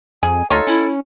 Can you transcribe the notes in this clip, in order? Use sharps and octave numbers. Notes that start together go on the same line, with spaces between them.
F2 G#4 G#5
D2 D#4 F4 A4 C#5
C#4 E4